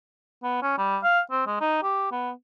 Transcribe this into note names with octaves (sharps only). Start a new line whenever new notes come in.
B3
C#4
G3
F5
C4
G#3
D#4
G4
B3